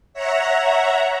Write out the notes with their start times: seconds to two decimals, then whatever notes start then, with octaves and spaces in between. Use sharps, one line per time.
0.13 C#5 E5 F#5 A#5